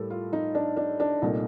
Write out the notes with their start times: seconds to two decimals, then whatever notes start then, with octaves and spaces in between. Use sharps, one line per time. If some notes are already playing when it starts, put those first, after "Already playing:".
Already playing: A2 G3 A4 A#4
0.10 F4
0.33 D#4
0.55 D4
0.77 D4
1.00 D4
1.22 C2 A#2 A3 D#4